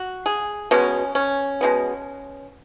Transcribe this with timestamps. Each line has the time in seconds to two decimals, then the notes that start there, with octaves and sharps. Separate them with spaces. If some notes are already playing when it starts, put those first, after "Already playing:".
Already playing: F#4
0.26 G#4
0.71 B2 G#3 B3 C#4
1.15 C#4
1.61 B2 G#3 B3